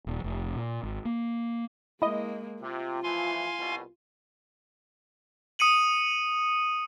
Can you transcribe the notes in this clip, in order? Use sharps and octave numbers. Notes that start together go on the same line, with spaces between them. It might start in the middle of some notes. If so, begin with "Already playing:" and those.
D#1
F1
A#2
G#1
A#3
G#3 A#3 E4 D#5
C3 F4
E3 F3 A3 F5 G#5 C6
C2 B2
D#6 C#7 D#7 F#7